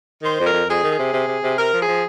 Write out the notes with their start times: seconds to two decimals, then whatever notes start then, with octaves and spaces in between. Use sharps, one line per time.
0.23 D#3 C5
0.39 F2
0.46 A#4
0.53 F2
0.68 F2 G#4
0.84 D#3
0.90 G#4
0.99 C3
1.13 C3
1.27 C3
1.43 C3
1.57 C3 A#4
1.72 F3
1.80 G#4
1.88 F3